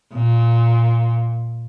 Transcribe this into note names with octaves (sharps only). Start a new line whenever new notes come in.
A#2